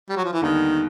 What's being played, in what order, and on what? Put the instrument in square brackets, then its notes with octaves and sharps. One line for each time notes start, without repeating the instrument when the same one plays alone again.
[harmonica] G3
F#3
F3
E3
[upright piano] D#2 D3 G3 B3 D#4 [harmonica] D#3